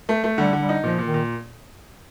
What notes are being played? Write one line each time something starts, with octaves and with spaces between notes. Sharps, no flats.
A3
A3
D3 G3
D3
G3
D#4
A#2 F3
A#2
D#3
A#2